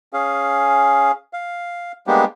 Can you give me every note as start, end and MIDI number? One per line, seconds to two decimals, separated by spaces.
0.13 1.11 61
0.13 1.11 68
0.13 1.11 77
1.33 1.92 77
2.07 2.25 55
2.07 2.25 56
2.07 2.25 58
2.07 2.25 59
2.07 2.25 62
2.07 2.25 67